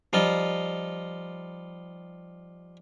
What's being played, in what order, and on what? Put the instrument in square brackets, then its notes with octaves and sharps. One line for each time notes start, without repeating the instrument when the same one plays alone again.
[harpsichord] F3 G3 D#4 F4 D#5